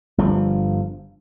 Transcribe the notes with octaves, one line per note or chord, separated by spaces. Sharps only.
G1 G2 F3